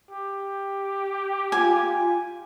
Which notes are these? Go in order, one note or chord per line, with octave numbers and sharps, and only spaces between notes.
G4
F4 G#5